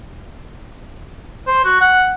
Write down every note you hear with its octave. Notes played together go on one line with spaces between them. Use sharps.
C5
F#4
F#5